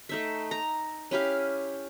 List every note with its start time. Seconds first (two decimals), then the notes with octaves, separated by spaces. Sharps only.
0.09 A3 D#4 E5
0.51 A#5
1.11 C#4 E4 G4 F5